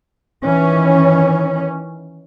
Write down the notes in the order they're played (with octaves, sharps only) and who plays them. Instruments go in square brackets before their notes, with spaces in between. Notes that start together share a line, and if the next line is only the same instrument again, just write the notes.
[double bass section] D#3 E3 C#4